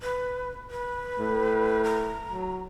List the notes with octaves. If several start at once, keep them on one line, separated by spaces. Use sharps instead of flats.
B4
B4
A2
A#5
F#3